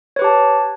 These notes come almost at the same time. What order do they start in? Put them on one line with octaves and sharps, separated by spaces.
C#5 B4 G4 A5